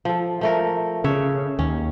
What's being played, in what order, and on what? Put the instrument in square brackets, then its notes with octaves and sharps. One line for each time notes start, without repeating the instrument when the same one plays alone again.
[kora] F3 A4
F3 A3 A#4
[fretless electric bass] C#3 [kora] C#5 E5
[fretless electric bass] D#2 [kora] C#4